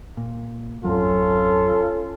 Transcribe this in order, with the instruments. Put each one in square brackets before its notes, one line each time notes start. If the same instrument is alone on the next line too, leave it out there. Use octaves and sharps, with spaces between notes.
[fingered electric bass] A#2
[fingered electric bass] G#1 F2 F#3 [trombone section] C#4 F4 A4